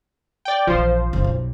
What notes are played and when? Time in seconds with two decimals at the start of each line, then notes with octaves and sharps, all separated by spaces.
0.45 D5 G5
0.67 A#1 E3 F3 C5
1.13 F#1
1.24 B1